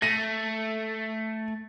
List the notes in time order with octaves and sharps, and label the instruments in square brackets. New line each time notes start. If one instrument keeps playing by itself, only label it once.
[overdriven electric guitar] A3 [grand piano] A#6 D#7